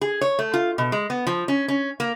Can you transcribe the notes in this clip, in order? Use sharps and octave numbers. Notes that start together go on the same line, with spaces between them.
G#4
C#5
A3
F4
B2
G#3
B3
F3
C#4
C#4
A#3